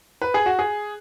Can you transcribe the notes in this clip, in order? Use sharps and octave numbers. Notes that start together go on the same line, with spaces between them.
B4
G#4
F#4
G#4